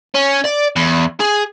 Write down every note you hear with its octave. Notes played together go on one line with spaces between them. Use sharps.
C#4
D5
E2
G#4